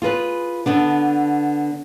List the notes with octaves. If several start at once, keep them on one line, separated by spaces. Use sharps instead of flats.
F4 G#4 A#4 B4
D3 B3 D4